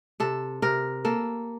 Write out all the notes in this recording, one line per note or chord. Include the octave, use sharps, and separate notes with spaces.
C3 A4
C3 A#4
A#3 A4